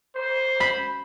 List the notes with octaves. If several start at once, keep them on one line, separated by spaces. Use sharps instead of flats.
C5
B5